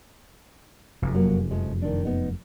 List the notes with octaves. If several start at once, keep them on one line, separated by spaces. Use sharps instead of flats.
F1 F#2
F#3 A#3
F3 G#3 A3
D#3 D4
B3 D#4